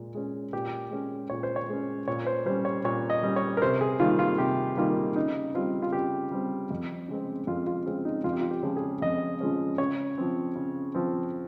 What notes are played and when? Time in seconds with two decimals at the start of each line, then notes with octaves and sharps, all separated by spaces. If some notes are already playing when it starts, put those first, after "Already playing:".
Already playing: A#2 G#3
0.15 G#3 C#4
0.53 A#2 G4
0.91 G#3 C#4
1.30 A#2 C#5
1.43 C5
1.56 C#5
1.69 G#3 C#4
2.08 A#2 C#5
2.27 C5
2.46 G3 C#4 C5
2.65 C#5
2.84 A#2 C#5
3.10 D#5
3.23 G3 C#4
3.36 C#5
3.57 A#4
3.62 C3 C5
3.81 G#4
4.00 D#3 G3 A#3 F4
4.19 F4
4.38 C3 G4
4.77 D#3 G3 A#3 F4
5.16 C#3 D#4
5.54 G3 C4 F4
5.82 F4
5.93 C#3 G4
6.31 G3 C4
6.71 F2
7.08 C#3 G#3 C4
7.47 F2 F4
7.67 F4
7.86 C#3 G#3 C4 F4
8.05 D#4
8.24 F2 F4
8.33 G4
8.41 F4
8.51 G4
8.63 C#3 F3 G#3 C#4
8.77 G#4
9.02 F2 D#5
9.41 C#3 F3 G#3 C#4
9.78 C#3 C#5
10.18 F3 C4
10.55 C#3
10.95 F3 C4